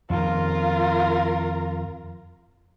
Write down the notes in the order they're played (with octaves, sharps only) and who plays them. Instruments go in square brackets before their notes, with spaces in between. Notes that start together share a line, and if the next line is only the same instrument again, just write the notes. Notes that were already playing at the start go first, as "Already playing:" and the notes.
[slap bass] F2 D#3 [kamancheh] F4 A#4